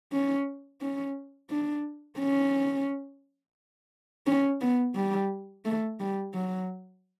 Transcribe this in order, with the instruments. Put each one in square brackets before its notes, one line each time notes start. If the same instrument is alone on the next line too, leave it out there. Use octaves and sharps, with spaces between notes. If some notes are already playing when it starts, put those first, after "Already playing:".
[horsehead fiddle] C#4
C#4
D4
C#4
C#4
B3
G3
A3
G3
F#3